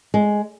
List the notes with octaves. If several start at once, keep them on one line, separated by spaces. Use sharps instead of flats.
G#3